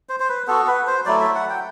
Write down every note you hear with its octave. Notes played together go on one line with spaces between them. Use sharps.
C5
C5
B4
B3 F#4 A4
B4
C5
F#3 A3 E4 D5
E5
F#5
G5